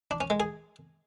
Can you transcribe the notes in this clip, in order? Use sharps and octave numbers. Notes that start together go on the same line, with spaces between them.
D4
C#4
G#3
G#4